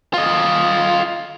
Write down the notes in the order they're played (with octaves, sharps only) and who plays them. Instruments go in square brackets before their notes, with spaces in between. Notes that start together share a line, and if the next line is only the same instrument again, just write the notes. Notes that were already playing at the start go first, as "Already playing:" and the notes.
[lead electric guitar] F4 D#5